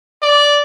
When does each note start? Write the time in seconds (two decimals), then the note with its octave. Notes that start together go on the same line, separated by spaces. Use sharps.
0.22 D5